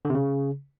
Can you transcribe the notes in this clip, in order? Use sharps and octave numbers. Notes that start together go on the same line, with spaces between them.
D3
C3
C#3